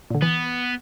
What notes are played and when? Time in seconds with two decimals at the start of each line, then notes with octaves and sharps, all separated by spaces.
0.10 A#2 D3
0.22 E3 B3